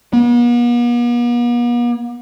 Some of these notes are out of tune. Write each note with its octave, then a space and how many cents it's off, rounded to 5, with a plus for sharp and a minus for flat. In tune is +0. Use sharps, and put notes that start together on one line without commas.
B3 -45